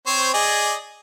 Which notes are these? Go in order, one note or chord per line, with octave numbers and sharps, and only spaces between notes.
C4 C5 C#5
G#4 D5 D#5